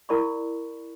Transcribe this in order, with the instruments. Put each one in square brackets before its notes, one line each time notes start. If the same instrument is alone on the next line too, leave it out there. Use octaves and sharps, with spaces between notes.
[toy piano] E4 A#4 D5 B5 C#6